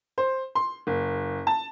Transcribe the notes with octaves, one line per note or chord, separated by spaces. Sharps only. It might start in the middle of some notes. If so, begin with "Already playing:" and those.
C5
C6
F#1
A5